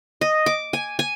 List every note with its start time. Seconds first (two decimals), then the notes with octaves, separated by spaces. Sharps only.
0.21 D#5
0.46 D6
0.73 G#5
0.99 G#5